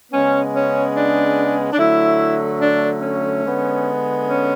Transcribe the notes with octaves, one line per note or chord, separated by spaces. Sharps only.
C#3 G#3 B3 C#4
C#4
D4
D4
D3 F#3 A3 E4
D4
C#4
D3 G#3 B3
C#4